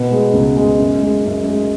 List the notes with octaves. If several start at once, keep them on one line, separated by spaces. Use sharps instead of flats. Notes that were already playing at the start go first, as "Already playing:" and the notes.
Already playing: B2 B3
G#3
C#2
G#3
F#2
G#3
F#2
G#3